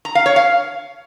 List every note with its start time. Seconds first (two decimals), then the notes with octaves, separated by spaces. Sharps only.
0.05 A#5
0.15 F5
0.26 C#5
0.36 F5